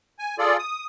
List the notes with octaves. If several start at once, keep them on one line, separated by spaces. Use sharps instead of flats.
G#5
F4 G#4 A4 D5
D#6